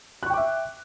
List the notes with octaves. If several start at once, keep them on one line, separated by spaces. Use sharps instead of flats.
E5 G5 C#6 D6 F#6